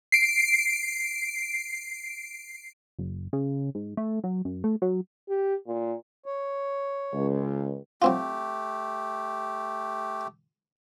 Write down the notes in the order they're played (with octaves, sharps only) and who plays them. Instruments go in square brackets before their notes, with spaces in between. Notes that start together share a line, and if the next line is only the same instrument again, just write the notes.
[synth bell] C7 D7
[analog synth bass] F#1
C#3
G#2
A3
F#3
F#2
A3
F#3
[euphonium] G4
A#2
[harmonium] C#5
[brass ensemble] C#2
[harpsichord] F#3 C4 F4 [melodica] A3 G4